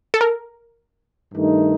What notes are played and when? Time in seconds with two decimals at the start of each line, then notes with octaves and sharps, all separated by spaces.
0.14 A4
0.21 A#4
1.33 G2 D#3 A3 D#4